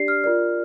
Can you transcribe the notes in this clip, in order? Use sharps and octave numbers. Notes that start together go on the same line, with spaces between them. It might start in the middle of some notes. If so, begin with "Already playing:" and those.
Already playing: D4 G4 D5 C7
F6
F4 A#4 D5 F6